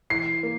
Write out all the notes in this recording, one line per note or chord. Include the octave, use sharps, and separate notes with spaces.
E3 C7
A#3